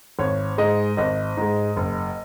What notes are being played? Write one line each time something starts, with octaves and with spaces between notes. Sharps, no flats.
G#1 C#5
G#2 G#3 D#5
G#1 D#5
G#2 G#3
F#1